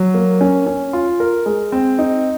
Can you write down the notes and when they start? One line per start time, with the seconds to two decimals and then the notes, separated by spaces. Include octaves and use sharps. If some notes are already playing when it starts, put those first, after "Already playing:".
Already playing: F#3
0.14 A#3
0.41 C#4
0.67 C#4
0.93 F4
1.20 A#4
1.46 G#3
1.72 C4
1.99 D#4